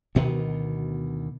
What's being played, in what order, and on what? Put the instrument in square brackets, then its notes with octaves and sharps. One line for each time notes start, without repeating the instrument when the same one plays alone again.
[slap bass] D2 B2 D#3 B3